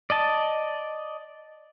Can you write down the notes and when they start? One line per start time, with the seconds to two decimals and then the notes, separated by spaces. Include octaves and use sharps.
0.10 D5 D#5 A5